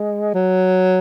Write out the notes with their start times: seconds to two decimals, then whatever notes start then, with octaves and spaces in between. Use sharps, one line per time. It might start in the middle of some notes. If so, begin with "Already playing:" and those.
Already playing: G#3
0.34 F#3